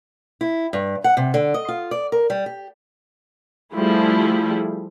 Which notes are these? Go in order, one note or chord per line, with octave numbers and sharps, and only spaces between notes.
E4
G2
F#5
C3
D3
D#5
F4
D5
A#4
G3
G4
F3 G3 A3 E4 G#4